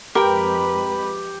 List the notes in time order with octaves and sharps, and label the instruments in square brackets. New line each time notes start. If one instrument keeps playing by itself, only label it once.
[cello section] F2 G#3 B4 [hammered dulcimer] G4 [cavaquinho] A#4 G5 [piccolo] B5